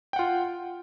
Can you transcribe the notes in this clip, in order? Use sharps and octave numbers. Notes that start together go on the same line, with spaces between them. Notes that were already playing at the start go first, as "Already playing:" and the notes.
F4 F#5 G5